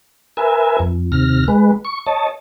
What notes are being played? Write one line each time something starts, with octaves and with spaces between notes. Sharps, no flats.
A#4 B4 E5 G#5
F2
D#2 C3 F6 A#6
G#3 B4
C#6
C#5 D#5 A5